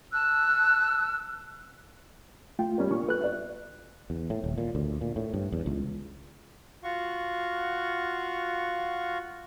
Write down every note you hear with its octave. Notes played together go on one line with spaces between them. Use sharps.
A5 E6 F#6
A3 F4 G5
G3 C#4 A#4
A#2 D4 C#6
A4 B4 F#6
D5 E5
E2
A2
D#1
A#2
D2
A#2
A2
G2
E2
C#2
F4 F#4 F5 F#5 C#6